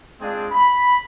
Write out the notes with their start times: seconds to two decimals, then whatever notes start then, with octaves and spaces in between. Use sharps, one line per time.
0.21 G#3 C4 D4 F4 G#4
0.52 B5